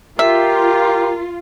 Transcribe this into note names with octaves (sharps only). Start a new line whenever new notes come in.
F4 G4 A#4 E5